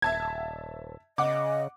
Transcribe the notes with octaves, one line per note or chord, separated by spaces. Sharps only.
D#1 E5 A5 G#6
C#3 D#5 F#5 D6